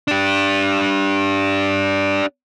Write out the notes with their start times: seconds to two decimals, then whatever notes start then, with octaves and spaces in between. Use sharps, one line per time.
0.08 D4 G4